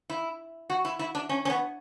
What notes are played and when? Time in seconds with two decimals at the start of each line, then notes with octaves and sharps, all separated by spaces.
0.10 E4
0.70 F#4
0.85 E4
0.99 E4
1.15 D4
1.29 C#4
1.45 C#4
1.50 B3